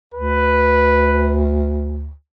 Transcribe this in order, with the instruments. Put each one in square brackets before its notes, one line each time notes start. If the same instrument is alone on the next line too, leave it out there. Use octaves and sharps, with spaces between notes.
[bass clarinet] D2 [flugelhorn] B4